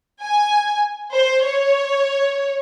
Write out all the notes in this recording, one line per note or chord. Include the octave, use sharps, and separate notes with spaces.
G#5
C5
C#5